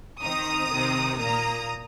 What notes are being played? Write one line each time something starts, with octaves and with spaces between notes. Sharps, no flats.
D#3 C4 A#5 D#6
C3 D#3 C4
A#2 A#3 A#5 D#6